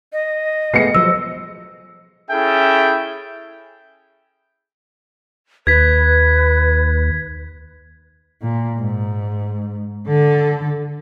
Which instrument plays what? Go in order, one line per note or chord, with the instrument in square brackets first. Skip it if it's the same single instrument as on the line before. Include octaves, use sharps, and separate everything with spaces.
[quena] D#5
[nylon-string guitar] G#3 A3 B3 [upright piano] C7 C#7
[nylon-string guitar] F3 F#3 C5 [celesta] E6
[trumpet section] C#4 E4 G#4 A4 E5 G5
[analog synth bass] D#2 [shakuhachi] B4 [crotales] G#6 B6
[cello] A#2
G#2
D3 A4